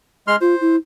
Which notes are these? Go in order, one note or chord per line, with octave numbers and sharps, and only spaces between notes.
G#3 C6 F6
F4 C5
E4